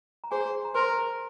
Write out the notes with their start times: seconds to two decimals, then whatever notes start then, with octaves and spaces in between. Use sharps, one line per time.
0.24 A#5
0.31 G#4 C5 G#5
0.65 A#5
0.74 A#4 C5 C6